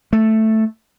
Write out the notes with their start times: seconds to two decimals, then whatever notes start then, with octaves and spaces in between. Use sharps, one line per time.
0.13 A3